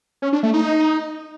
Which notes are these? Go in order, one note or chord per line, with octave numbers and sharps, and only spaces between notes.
C#4
D4
A3
D#4